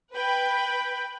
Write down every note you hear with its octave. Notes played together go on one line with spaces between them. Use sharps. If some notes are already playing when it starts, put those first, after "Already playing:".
B4 G5 B5